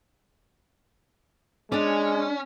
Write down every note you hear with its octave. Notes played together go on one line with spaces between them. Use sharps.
G#3 C#4 D4 D5